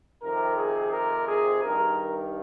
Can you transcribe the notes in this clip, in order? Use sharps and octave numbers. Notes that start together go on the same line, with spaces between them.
F2 C3 D#3 A#4
G#4
A#4
G#4
G2 D#3 A#4